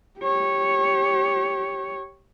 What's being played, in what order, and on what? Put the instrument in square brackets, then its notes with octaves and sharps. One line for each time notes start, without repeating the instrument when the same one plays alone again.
[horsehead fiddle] G4 C#5